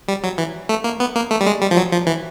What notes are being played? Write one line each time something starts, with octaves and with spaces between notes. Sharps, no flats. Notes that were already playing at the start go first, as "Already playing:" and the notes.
G3
F#3
E3
A3
A#3
B3
A#3
A3
G3
G#3
G3
F3
F#3
F3
E3